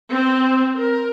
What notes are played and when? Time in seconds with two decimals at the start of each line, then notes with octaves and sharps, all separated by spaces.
0.12 C4
0.77 A#4